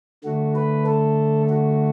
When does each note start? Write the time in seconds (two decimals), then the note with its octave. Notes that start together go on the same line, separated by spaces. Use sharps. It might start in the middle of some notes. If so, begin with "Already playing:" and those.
0.24 D3 A3 F#4
0.56 B4
0.86 A4
1.49 F#4